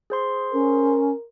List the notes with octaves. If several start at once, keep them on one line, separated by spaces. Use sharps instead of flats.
G#4 C5 C6
C#4 A#4